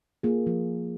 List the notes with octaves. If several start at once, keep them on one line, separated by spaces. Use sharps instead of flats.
A#3 F4 G#4
F3